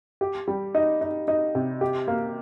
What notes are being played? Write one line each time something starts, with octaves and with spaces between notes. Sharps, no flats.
G4
G3
D#4
D#4
D#4
C3
G4
A#3